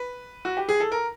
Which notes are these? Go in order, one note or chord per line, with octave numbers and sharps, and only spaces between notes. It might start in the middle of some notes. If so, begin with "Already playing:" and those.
Already playing: B4
F#4
G4
G#4
A4
A#4